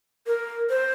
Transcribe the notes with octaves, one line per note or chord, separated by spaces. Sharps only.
A#4
C5